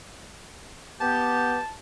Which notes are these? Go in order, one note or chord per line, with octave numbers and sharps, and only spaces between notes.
B3 G4 A5